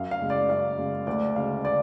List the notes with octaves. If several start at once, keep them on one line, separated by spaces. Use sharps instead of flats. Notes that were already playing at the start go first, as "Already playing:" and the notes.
Already playing: F#2 F5
F5
C#3 G#3
D5
F#2 F5
C#3 G#3
D2 D5
C#3 G#3 F5
D5